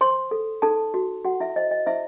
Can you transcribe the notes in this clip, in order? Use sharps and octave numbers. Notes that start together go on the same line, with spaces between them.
C5 C6
A4
D#4 A4 A5
F#4
F#4 F#5
E4 E5
C5 D#5
D#5
E4 C5 E5